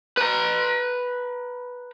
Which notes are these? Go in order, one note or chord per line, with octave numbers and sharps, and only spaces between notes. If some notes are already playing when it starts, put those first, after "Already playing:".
B4 A#5